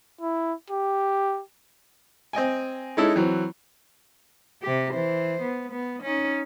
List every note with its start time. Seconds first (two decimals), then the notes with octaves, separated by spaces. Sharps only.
0.21 E4
0.70 G4
2.33 C4 D#5 G5 G#5
2.97 G#3 C#4 D#4 E4 A4
3.16 E3 F#3 C4
4.63 C3 G4
4.94 E3 C5
5.42 B3
5.71 B3
6.03 C#4 D#4